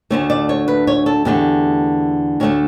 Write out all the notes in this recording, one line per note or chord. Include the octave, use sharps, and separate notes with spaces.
D2 D3 A3 C#5
D5
C#5
B4
C#5
A4
E2 D3 A3 G4
D2 D3 A3 C#5